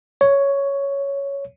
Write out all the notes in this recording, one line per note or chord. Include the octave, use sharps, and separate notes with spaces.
C#5